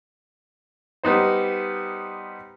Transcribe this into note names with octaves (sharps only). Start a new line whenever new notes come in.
G3 B3 D#4 C5